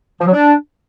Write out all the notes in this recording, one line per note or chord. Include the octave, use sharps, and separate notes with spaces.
F3
F#3
D4